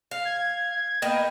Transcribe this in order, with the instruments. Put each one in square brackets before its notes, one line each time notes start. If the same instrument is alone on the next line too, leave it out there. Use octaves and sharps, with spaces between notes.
[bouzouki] F5
[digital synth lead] G#6
[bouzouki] A#3 B3 D#5 [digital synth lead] G5